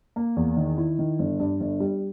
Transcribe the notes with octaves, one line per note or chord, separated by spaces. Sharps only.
A#3
E2
D#3
E4
D#3
G1
G2
G1
G3